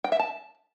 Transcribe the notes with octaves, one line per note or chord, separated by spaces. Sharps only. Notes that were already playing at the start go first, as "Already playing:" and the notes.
G5
E5
A5